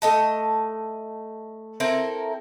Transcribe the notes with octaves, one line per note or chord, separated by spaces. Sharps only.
A3 D#5 A5
C4 E4 A4 A#4